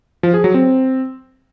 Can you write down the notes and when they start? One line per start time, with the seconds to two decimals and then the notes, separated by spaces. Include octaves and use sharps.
0.23 F3
0.34 G#4
0.44 F#3
0.54 C4